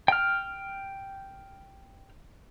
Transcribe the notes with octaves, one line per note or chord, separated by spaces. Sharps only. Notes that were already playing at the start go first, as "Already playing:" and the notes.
G5 F6